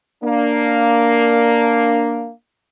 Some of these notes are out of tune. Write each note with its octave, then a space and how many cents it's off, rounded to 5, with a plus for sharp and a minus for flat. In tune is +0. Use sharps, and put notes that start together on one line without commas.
A#3 +0 D4 +0